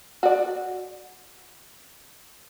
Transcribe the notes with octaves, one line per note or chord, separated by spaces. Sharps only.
F#4 D5